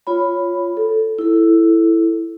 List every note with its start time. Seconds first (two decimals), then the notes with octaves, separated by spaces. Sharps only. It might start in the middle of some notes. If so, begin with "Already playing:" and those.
0.07 F4 C#5 B5
0.77 A4
1.19 E4 A4